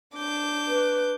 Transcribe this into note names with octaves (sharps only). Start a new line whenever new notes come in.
D4 D6 G6
B4